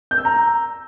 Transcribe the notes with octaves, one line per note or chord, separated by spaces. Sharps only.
G6
E6
A#5